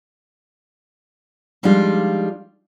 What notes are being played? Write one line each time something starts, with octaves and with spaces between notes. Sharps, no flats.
F3 G3 G#3 D4 D#4 F4